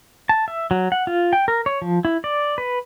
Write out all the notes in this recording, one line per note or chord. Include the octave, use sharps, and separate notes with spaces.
A5
E5
F#3
F#5
F4
G5
A#4
C#5
F3
E4
D5
B4